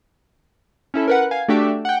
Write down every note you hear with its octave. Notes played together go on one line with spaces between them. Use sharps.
C#4 E4 A4
A#4 B4 F#5
F5 G#5
A3 D4 F#4 G4 D5 E5
F#5 G5